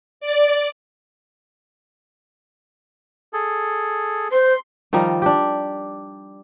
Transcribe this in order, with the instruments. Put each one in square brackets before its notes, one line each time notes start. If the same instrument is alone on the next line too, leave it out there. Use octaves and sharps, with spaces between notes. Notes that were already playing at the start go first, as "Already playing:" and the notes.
[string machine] D5
[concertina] G#4 A4
[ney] C5 [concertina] C6
[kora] D#3 F3 G3 D#4
D4 G4